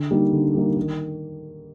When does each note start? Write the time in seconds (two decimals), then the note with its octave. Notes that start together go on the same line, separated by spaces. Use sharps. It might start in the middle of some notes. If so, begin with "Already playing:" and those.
Already playing: D3
0.11 G3 A#3 D#4
0.33 D3
0.55 G3 A#3 D#4
0.76 D#3